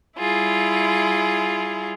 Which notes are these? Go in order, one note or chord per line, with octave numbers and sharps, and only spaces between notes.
G3 E4 F4 G#4